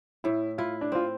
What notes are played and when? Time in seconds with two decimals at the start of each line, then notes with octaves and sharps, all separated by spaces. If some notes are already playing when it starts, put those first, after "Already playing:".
0.24 A2 E4
0.58 E4 F4
0.81 D4
0.92 C4 F4